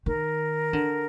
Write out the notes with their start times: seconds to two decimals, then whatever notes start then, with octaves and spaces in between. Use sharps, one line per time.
0.06 D#3 A#4
0.73 D3